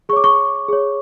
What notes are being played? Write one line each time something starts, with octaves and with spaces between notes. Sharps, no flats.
G#4 C#5 C#6 D6
C#6
G#4 C#5